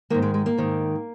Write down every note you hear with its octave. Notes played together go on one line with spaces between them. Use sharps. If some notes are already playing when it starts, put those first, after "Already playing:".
G#2 D#3 A#3
G#3
G#3
A#3
G#2 D#3